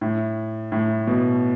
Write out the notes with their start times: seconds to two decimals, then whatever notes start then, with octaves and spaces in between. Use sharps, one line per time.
0.01 A2
0.72 A2
1.07 B2